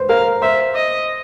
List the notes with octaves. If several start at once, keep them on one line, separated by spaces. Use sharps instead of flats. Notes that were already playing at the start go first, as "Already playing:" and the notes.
Already playing: B4 C5
A#4 F5
C5 E5
D#5